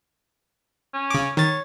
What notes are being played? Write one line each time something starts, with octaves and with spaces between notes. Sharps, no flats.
C#4
C#3 D6
D#3 C#5 A6